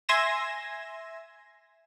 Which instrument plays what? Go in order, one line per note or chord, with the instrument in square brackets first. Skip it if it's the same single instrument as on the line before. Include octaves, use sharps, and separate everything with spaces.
[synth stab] E5 G#5 C6 G#6 A#6 E7